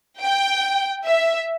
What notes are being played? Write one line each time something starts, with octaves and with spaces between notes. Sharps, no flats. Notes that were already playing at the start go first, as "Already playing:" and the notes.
G5
E5